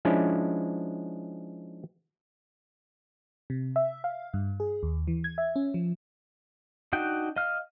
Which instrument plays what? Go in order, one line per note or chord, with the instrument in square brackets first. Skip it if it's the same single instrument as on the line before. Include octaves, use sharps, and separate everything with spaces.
[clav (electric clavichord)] F3 G#3 C#4 D4 E4
[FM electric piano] C3
E5
F5
G2
G#4
D#2
E3
G#6
E5
C#4
F3
[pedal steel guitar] D4 D#4 F#4 G5
D#5 F5 F6